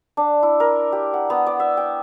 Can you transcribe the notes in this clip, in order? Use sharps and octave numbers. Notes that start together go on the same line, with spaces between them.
D4
E4
A#4
G4
F#5
B3
D5
E5
G5